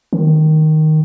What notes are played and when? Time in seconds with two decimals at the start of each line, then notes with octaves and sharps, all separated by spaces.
0.13 D#3